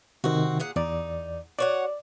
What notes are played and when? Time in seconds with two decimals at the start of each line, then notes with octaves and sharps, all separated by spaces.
0.24 C3 D#3 C4 F#4
0.60 A#2 G#4 F#5
0.76 E2 D#4 D5
1.59 F#4 C#5 D5 F#5